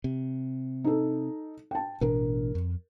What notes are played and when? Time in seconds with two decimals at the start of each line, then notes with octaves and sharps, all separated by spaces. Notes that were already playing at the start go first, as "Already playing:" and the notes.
0.04 C3
0.84 D#4 A4
1.71 G5 A5
2.01 A1 B2 D4 A#4
2.55 F2